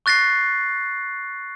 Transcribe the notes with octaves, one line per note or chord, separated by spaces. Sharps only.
C#6 F#6 A6 A#6 C7